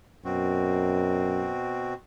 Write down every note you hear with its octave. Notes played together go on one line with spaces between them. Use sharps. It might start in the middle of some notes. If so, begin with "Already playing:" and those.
F#2 B2 C4 F#4